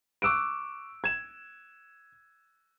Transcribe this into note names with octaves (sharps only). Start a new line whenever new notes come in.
C#6 D6 E6 F#6 D7
G#6 E7